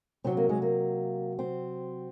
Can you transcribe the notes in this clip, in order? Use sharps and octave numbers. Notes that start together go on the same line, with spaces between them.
C3 F#3 C4
A#3
G#3
A#3
C4